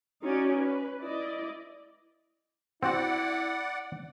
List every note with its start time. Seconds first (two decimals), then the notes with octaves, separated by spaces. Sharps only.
0.23 C#4 D#4 F#4 D5
0.57 B4
1.02 E4 D5 D#5
2.83 C4 E4 F#4 D5 F#5